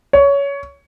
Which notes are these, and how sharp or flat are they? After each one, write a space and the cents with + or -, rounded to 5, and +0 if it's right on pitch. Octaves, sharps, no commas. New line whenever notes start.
C#5 +20